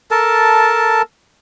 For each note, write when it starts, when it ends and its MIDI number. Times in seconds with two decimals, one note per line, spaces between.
0.11 1.02 69
0.11 1.02 70
0.11 1.02 81